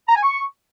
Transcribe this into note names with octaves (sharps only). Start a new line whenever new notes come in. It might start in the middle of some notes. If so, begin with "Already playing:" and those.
A#5
G#5
C#6